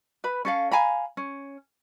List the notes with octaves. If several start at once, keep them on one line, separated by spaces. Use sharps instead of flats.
B4 B5
C#4 A4 F5
F5 G#5 A#5 B5
C#4